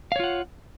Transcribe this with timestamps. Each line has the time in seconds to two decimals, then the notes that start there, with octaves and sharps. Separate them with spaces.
0.12 F5
0.16 C#5
0.20 F4
0.24 F#5